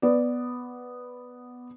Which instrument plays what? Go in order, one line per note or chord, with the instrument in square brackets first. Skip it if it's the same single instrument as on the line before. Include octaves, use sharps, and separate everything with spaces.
[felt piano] B3 D5